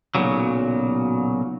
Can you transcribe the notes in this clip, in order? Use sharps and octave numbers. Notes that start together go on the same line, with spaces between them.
B1 A#2 C#3 F#3